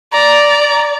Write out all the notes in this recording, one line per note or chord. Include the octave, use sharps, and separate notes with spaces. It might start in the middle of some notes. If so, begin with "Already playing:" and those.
D5 A#5